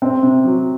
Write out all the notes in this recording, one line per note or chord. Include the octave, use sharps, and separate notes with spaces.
C4
C3
F#3